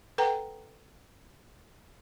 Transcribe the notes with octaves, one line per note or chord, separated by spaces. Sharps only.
A4 B4 F#5 G5 A#5